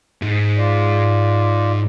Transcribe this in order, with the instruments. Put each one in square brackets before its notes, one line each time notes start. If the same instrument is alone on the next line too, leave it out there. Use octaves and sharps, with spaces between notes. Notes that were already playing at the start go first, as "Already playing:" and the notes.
[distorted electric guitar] G#2
[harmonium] F4 D5